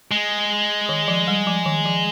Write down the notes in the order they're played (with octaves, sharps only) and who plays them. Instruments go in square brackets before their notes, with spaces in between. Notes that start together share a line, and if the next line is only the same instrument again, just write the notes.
[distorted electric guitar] G#3
[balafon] D#3
F3
G3
F3
D#3
F3